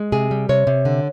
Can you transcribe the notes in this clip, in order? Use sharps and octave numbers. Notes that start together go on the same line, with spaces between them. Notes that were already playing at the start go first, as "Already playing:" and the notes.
Already playing: G#3
C3 G#4
G3
C3 C#5
C3
D3